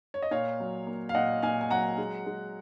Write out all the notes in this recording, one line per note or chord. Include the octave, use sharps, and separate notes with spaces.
C#5
D#5
A#2 C#5 F5
F#3
A#3
F5
A#2 D#5 F#5
A#2 F5 G#5
G#5
F#3 F#5 A#5
G#3
G#3